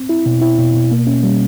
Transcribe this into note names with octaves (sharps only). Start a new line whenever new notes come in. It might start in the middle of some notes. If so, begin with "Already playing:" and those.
Already playing: C4
E4
B2
E4
B2
B2
A#3
C#4
G3